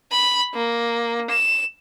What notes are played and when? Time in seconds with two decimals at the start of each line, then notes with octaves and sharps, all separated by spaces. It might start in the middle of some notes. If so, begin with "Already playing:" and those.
0.12 B5
0.54 A#3
1.30 E7